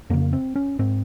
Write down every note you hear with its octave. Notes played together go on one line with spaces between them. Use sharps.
F2 C#3 A#3
C4
C#4
G#2 C4